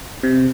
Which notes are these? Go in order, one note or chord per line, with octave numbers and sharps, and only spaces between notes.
C3